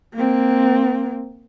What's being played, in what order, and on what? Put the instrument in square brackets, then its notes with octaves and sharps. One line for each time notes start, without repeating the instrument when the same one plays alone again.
[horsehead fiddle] A#3 C4